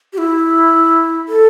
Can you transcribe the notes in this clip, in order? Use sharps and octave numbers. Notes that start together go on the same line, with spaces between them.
G4
E4
A4